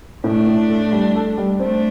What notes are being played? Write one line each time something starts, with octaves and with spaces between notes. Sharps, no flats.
A2 A3 D4
A2
A4
G3
A4
G3
A3 C4 D4